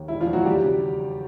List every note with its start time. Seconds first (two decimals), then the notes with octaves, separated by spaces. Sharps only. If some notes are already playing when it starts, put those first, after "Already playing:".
Already playing: D#2
0.08 E1 E4
0.20 F3 F4
0.27 E2
0.33 F#3 F#4
0.45 D#2 G3 G4
0.64 C#3